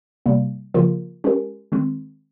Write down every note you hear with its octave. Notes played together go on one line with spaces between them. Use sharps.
C3 G3 A#3
C#3 F3 A#3 F4 A#4
G#3 C#4 G4 A#4
D#3 G#3 C4